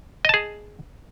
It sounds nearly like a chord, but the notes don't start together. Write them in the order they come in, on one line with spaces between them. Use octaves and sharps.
D#5 A5 G#4